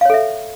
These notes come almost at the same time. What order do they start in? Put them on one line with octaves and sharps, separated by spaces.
F5 C#5 A4 E5